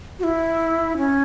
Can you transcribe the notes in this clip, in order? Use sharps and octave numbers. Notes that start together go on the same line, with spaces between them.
F#4
E4
C#4